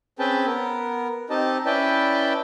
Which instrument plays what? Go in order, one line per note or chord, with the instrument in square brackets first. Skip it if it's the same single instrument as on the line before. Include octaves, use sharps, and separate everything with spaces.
[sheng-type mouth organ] C4 C#4 G#4 B4 G5 A5
B3 A#4
C4 D#4 G4 D#5 A5
C#4 E4 B4 D5 G5 A5